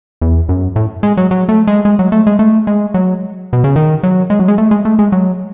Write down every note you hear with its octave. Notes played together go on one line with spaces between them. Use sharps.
E2
F#2
A2
G#3
F#3
F#3
A3
G#3
G#3
F#3
A3
G#3
A3
G#3
F#3
B2
C#3
D#3
F#3
G#3
F#3
G#3
A3
G#3
A3
G#3
F#3